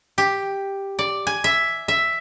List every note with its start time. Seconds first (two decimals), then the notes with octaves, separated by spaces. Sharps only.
0.18 G4
0.99 D5
1.27 G#5
1.44 E5
1.88 E5